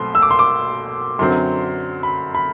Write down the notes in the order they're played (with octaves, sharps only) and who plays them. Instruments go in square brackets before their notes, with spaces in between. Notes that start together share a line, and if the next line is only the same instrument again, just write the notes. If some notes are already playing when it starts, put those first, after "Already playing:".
Already playing: [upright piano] B1 B2 A3 C4 [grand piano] C6
[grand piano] E6
D6
C6
D6
[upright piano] F#2 D3 F#3 C4 [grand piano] C6
[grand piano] B5
B5